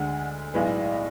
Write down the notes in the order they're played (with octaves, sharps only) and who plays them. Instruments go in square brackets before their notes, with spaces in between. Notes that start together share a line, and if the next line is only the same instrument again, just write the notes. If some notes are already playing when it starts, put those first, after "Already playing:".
Already playing: [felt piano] D2 D3 G#3 [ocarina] F#5
[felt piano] B1 A2 G#3 B3 [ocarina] D5